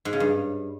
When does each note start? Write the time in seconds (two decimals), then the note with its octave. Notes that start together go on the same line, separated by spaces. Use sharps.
0.05 G#2
0.13 C#3
0.20 G2